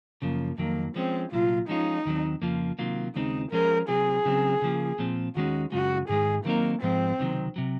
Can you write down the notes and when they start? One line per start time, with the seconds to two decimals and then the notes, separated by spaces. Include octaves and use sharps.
0.22 F#2 C#3 F3 A#3
0.58 F2 D#3 F#3 A#3
0.96 F3 G#3 C4 C#4
1.32 C2 A#2 F#3 F4
1.69 F3 G#3 C#4 D#4 F4
2.06 D#2 D#3 F#3 C4
2.42 F2 C#3 F3 A#3 F4
2.79 C3 D#3 F#3 A#3 F4
3.15 D#2 C#3 G#3 C4 D#4
3.52 F3 G#3 C#4 G#4 A#4 C5
3.88 C3 F#3 C4 G#4
4.25 C#3 F#3 C4
4.62 C#3 F3 A#3
4.99 A#2 F3 C4
5.35 D#2 D#3 G#3 C#4 F#4
5.72 F#2 C#3 G#3 F#4
6.09 G#2 D#3 G#3 G#4
6.45 D#3 F#3 A#3 C4 D#4 A#4
6.82 G#2 F3 G#3 C4
7.19 C#2 C3 D#3 F#3
7.56 C3 F#3